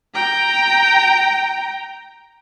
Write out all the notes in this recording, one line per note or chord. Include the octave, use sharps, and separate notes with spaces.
G5 A#5